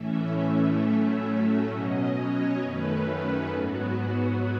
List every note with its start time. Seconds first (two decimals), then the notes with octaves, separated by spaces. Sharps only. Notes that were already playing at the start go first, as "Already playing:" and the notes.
Already playing: A2 E3 A3 C#4 E5
0.79 A2 F#3 A3 C#4
1.69 B2 F#3 C#4 D#5
2.13 C#5
2.60 F#2 D#3 A3 C#4 B4
3.05 B4
3.50 G#2 F#3 B3 F#4